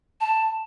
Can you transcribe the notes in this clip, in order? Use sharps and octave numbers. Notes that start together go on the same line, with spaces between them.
A5